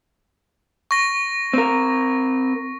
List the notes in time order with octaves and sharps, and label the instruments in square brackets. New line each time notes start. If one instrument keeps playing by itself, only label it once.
[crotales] C#6 A#6
[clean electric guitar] C4 A#4